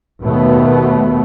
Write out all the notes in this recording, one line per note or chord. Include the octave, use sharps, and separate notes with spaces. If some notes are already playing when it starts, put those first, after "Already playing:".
D#2 B2 A3 B3